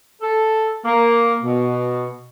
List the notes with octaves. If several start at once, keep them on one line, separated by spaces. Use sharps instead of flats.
A4
A#3
B2